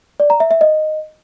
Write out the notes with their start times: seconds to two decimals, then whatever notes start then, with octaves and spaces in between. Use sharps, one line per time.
0.20 D5
0.30 A#5
0.40 E5
0.51 E5
0.61 D#5